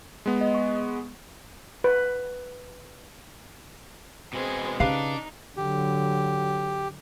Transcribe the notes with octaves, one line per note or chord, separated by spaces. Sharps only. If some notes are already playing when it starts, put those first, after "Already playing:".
G#3 B3
D#5
C#6
B4
B2 G#3 C4 G#4
C#3 D4 D#4 G4 B4 F5
D3 F#3 G4